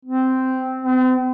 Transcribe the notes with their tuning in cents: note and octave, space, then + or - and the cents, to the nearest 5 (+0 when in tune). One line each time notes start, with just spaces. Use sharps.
C4 -10
C4 -40